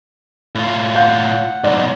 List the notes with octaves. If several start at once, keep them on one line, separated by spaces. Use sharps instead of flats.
A2 F4
F5 F#5 G6
B1 G#2 D5